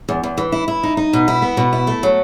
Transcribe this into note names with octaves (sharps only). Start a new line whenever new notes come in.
E2
E2
E3
E4
E4
D#4
D#4
B2
E4
B3
B2
E4
A3
F#3